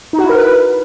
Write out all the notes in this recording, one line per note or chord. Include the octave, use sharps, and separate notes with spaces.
D#4
F#4
E4
A#4
B4